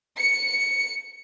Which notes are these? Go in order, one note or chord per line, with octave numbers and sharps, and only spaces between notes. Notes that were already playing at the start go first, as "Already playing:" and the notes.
C#7